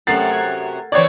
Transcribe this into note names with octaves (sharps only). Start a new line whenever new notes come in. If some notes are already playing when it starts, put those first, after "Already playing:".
F#2 C3 F#3 A3 A#4 F#5 A6 C7
G#6
E3 A3 B3 C4 C#5 D5 G#6